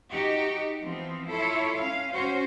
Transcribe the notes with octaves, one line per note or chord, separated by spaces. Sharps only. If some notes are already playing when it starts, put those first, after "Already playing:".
D#4 F#4 G4
E3 F3 B3 C4
E4 F4 A4 C#5
C#4 F5
C#4 F#4 C5